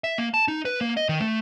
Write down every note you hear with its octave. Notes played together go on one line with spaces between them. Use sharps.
E5
A#3
A5
D#4
B4
A#3
D#5
D#3
A3